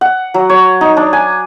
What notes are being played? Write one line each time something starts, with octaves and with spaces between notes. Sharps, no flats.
F#5
F#3
C#5
D#4
D4
G#5